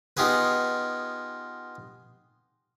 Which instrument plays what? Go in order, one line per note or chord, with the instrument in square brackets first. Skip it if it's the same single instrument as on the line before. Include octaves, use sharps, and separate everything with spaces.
[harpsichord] B3 D#4 F4 G4 G#4 B4